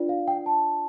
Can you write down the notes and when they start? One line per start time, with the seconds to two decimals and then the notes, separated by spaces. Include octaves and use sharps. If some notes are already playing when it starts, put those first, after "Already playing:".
Already playing: D4 F4 B4 D5
0.09 F5
0.28 G5
0.46 A5